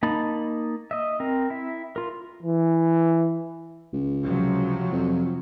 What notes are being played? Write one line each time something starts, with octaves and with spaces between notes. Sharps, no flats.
A#3 D#4 A5 B5
D#5 E5
C4 A#4
E4 E5
F4 A#4
E3
C#2
C3 F3 F#3
F2